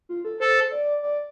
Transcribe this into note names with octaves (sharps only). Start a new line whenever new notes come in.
F4
A4
A4 C5
D5
D5